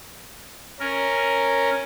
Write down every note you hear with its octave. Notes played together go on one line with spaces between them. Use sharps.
C#4 A#4